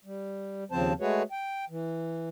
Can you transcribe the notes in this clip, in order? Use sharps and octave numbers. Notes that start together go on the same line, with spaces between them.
G3
D#2 C#3 F3 C4 C5 A5
G#3 A3 F#4 G#4 B4 C#5
G5
E3